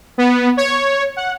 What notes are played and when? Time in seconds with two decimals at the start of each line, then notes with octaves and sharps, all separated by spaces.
0.18 B3
0.57 C#5
1.16 F#5